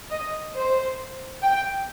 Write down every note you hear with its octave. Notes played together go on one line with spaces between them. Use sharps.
D#5
C5
G5